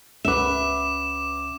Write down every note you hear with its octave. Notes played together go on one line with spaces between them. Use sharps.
C#2 C#4 B4 E5 F#5 D6 E7